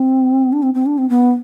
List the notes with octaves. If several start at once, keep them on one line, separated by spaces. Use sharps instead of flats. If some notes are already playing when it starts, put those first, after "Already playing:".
Already playing: C4
D4
C4
C4
D4
C4
B3